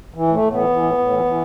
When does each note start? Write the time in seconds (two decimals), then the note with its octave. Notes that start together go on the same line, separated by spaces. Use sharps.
0.14 E3
0.27 A2 A3
0.42 A2
0.51 E3 B3
0.69 E3
0.83 A2
0.98 A2
1.11 E3
1.25 E3